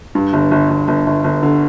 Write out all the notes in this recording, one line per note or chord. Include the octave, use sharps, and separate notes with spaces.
G2
G1
G1
G1
G1
G1
G1
D3